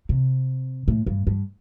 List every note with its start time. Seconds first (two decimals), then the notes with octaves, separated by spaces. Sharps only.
0.09 C3
0.88 A2
1.06 G2
1.27 G2